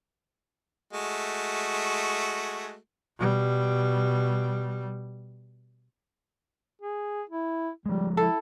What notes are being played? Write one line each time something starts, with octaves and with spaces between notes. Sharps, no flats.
G#3 A3 F#4
B2 G3
G#4
E4
F3 G3 G#3
E4 A4